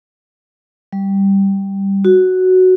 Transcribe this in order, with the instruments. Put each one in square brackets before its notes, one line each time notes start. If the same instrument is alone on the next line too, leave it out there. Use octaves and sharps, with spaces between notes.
[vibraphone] G3
F#4